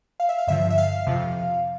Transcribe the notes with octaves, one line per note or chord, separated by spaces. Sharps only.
F5
E5
F5
G2 D3 F3 E5
E5
F5
F2 C3 F3